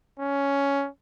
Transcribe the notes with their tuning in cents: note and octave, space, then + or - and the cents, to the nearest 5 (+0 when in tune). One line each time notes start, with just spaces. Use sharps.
C#4 +10